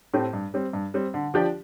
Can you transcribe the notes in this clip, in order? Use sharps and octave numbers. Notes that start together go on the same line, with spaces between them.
A2 A3 C4 G4
G2
G3 C4
G2
G3 C4
D3
F3 D4 G4 D5